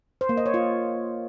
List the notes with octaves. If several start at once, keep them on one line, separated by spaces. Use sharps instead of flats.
C5
A#3
D#5
C#5
F4